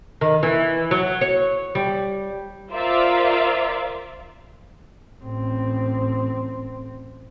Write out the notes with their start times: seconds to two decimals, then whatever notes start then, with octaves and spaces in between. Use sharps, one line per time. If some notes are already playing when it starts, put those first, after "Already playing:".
0.21 D#3
0.43 E3
0.91 F#3
1.21 C#5
1.75 G3
2.72 F4 A#4 C5 D5 E5 F5
5.22 A1 C4